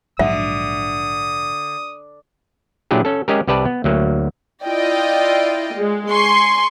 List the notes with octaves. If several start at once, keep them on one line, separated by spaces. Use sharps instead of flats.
A#1 G#2 D3 F#3 E5 D#6
A#2 F#3 D4 E4 G4 G#4
C#4 A4
G#3 C#4 G4 G#4 A#4
C2 G4 B4 D5 A5
B3
D2 F#3 A#3
E4 F4 D5 D#5 G5
G#3
G#5 C6 C#6